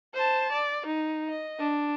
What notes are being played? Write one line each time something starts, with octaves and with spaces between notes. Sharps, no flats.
C5 A5
D5
D#4
D#5
D4